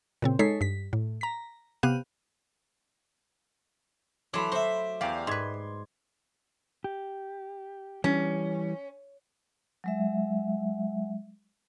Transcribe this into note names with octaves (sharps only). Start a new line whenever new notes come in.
A#2 C#3 C4
G#3 D#4 A4 C#5 B6 C7
G2 B6
A2
A#5 B6
C3 B3 G4 F5 F#6 D#7
E3 F#3 A3 B5 C6 D6
F#4 C5 E5
E2 G4 D5 F5
G#2 B4 C6 G#6
G4
E3 G3 C#4
F#3 G#3 E5